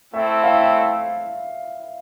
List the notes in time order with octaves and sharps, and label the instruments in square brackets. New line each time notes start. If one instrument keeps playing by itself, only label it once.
[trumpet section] A3 C4 E4 A4 [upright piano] E5
[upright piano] F5